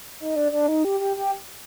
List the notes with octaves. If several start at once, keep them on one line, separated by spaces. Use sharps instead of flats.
D#4
D4
D4
D#4
G4
G4
G4